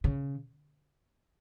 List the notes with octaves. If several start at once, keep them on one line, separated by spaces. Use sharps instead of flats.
C#3